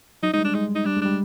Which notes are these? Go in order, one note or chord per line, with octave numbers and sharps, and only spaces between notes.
F#3 D#4
G3 G#3 D#4
D4
G#3 D#4
D#4
G3 D4
G#3
G3 D4